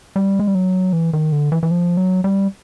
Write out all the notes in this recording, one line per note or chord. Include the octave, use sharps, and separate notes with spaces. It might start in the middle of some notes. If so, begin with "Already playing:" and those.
G3
G#3
G3
F#3
E3
D#3
D3
E3
E3
F3
F#3
G3